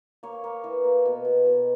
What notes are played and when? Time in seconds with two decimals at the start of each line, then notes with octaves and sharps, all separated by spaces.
0.23 A#3 C#5
0.44 A#3
0.64 E3
0.84 A#3
1.05 B2
1.25 B2
1.46 B2